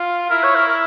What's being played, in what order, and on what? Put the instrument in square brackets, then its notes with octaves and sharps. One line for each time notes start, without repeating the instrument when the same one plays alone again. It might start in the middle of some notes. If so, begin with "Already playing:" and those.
Already playing: [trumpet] F4
[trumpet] E4 [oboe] A#4
[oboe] C#5
A#4
A#4